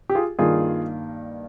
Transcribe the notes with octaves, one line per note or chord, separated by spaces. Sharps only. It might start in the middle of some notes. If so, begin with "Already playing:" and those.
G4
F4 G#4
G2 D#3 A#3 F4 G#4